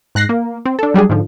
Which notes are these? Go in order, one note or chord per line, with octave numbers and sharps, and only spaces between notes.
G#2 F#6 A#6 C7
A#3
C4
D4 A4
F#3 G3 D4 G#4
G#2 D3 F3